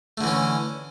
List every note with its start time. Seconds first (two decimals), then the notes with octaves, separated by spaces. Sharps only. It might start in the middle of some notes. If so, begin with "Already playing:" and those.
0.17 A3
0.21 D3
0.24 E3
0.27 C#4